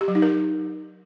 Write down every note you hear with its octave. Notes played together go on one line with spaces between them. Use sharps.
G4
F#3
D#4
A#4